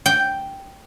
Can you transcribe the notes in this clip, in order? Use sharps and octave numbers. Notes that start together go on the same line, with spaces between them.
G5